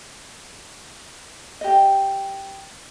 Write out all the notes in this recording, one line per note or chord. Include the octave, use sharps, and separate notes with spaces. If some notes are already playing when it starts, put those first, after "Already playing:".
G4 D#5